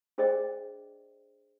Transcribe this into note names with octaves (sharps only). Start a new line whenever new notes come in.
D4 G#4 C5 D5 D#5 G5